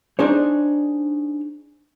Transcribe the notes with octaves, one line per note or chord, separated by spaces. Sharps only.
D4 D#4 G#4 C5 C#5